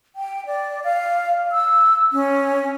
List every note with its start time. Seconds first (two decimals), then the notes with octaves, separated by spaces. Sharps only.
0.16 G5
0.46 D5
0.84 F5
1.52 E6
2.13 C#4